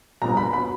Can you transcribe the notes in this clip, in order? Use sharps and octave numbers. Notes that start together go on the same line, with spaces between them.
A#1 A#2 G3 B3 A#5
B5
B5
F#3 B3